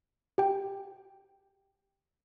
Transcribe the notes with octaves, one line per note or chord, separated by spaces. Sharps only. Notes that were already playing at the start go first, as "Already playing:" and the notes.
G4 G5